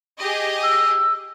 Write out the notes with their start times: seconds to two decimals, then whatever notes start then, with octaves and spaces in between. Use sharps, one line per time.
0.19 G4 G#4 D#5
0.63 E6